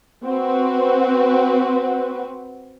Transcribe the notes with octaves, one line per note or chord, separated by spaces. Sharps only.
C4 F#4 B4